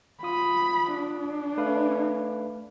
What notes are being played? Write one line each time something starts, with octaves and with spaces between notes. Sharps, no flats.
F4 B5 D#6
D4
A3 B4 F5